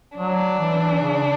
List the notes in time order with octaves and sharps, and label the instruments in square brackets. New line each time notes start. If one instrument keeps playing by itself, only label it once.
[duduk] F#3 [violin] D4
[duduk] E3
C#3